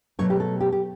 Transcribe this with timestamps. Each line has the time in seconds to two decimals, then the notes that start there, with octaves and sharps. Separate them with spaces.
0.19 B2 F#3 A3 C#5
0.30 G4
0.40 A4
0.61 G4
0.72 G4